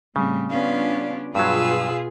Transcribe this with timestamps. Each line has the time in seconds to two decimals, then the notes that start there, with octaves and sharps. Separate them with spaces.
0.16 A2 C#3 G3 C4
0.50 G3 B3 C#4 D4 F4 F5
1.35 G2 B2 F#3 F4 G#4 B4 F5 E6